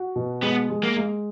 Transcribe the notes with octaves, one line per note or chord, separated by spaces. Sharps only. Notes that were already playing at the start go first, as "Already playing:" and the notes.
Already playing: F#4
B2
G#3 B3
G#3
A#3
G#3